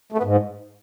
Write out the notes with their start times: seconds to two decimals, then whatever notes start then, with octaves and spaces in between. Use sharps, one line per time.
0.12 A3
0.18 B3
0.23 G#2